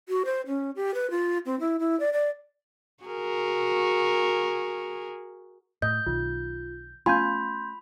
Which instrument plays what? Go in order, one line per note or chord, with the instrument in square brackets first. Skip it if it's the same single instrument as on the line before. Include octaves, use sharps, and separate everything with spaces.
[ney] F#4
C5
C#4
G4
B4
F4
C4
E4
E4
D5
D5
[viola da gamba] F#4 G#4 A#4
[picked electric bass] A2 [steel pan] D#5 [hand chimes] G6
[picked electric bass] B1 D#3 [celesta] F4
[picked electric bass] A3 B3 C#4 [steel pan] F4 G#5 [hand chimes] B5 [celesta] C6 G6